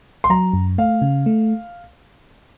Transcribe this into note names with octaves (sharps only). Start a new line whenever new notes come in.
C6
F#3 A#5
F#2
A3 F5
C#3
A3